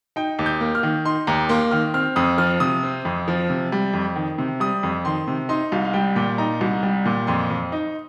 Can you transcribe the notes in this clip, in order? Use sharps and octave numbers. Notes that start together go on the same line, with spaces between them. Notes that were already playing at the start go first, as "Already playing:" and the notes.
D#4 G5
D#2
G6
A#3
F6
D#3
D#4 C6
D#2 A#5
A#3 C6
D#3 F6
C4 F6
F2 D#6
F3 F6
C3 D#6
C4
F2
F3
C3
G3
F2
D#3
C3
G3 D#6
F2
D#3 C6
C3
D#4 C6
C2 F5
F5
G3 G5
A#2 G5
D#4 A#5
C2
G3
A#2
F2 C6
F2
D#4